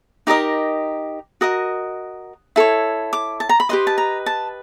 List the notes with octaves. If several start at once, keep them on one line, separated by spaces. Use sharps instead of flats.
D#4 G4 A#4 D#5 D6
F#4 A#4 D#5 D#6
E4 A4 C#5
D6
A5
A#5
B5
G4 B4 D#5 C6
A5
A#5
A5